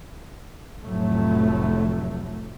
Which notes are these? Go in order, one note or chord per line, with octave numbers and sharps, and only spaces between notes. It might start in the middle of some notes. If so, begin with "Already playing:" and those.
F1 A2 F#3 A3